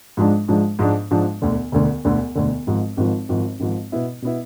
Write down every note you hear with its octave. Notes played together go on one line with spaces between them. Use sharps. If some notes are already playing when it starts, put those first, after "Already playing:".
G#2 F3 G#3 D4
G#2 F3 G#3 D4
G#2 F3 G#3 D4
G#2 F3 G#3 D4
E1 D2 D3
E1 D2 D3
E1 D2 D3
E1 D2 D3
G#1 G#2 F3
G#1 G#2 F3
G#1 G#2 F3
G#1 G#2 F3
B2 B3 E4
B2 B3 E4